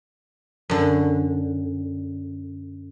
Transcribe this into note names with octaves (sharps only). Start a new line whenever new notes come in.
F#2 D3